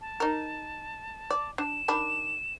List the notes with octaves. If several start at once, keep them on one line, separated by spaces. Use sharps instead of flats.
A5
D#4 A#4
D5
D4 E7
D#3 D4 B5